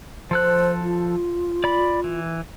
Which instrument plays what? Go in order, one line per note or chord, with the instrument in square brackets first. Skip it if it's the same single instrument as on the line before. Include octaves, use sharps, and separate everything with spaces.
[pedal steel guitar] F3 A4 F#6 [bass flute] C5
[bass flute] F4
[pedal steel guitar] D5 B5
E3